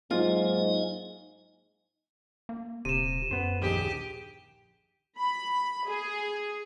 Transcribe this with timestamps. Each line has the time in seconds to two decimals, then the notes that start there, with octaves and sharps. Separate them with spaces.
0.11 G#2 F#3 A#3 D#4 F4 D#5 G#5
2.49 A#3
2.85 D#1 C3 D#7 E7
3.31 F#2 B3 C5
3.62 A#1 D#2 G4 G#4
5.20 B5
5.89 G#4